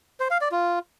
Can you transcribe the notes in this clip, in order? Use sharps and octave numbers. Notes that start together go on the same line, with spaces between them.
C5
F5
D5
F4